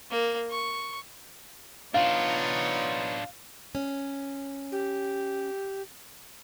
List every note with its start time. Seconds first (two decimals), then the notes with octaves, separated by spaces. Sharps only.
0.11 A#3
0.50 C#6
1.94 B3 D4 D#4 F4 C#5 F5
3.75 C#4
4.72 G4